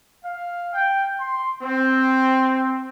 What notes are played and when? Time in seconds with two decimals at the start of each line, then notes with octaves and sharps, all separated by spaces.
0.24 F5
0.74 G5
1.19 C6
1.62 C4